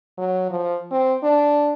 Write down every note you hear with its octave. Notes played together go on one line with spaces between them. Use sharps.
F#3
F3
C4
D4